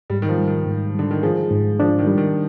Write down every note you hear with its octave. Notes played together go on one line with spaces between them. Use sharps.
G#2 G3
D#3
F3
G3
D#3
G#2
D3 G3
D#3
F3 G#4
G#2
F3 D4
D#3
G3
D#3